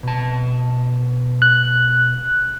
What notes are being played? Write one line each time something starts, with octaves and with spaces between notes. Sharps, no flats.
B2 A5
F#6